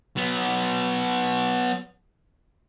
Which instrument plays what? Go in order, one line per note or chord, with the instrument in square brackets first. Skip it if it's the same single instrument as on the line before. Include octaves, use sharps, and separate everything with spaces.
[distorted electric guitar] F#3 B3